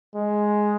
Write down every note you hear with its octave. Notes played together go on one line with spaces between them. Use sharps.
G#3